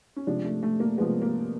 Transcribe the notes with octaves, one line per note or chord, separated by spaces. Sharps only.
C#4
C3 F3 G#3 D4
A3
A3
A#3
C3 F3 G#3 B3
A#3